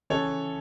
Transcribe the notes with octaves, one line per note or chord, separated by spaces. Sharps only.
C#3 E3 A4 C#5